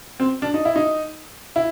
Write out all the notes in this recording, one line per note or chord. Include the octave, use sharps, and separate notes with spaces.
C4
D4
D#4
E4
D#4
E4